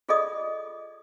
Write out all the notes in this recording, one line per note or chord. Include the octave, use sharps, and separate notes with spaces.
F4 G#4 A4 D5 D#5 D#6